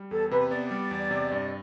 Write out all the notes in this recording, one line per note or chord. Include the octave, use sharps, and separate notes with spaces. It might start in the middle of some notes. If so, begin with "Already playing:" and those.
Already playing: G3
E2 A4
C3 B4
B3 D5
G3
E2
C3
G2